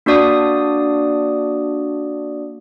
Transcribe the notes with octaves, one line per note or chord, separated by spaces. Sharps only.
A#3 D4 F#4 D5 D#6